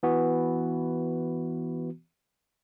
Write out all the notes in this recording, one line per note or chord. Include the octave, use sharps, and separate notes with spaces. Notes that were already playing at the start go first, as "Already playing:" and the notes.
E3 B3 F#4